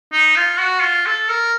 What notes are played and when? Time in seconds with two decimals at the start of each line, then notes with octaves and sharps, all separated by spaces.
0.12 D#4
0.36 F4
0.60 F#4
0.82 F4
1.06 A4
1.29 A#4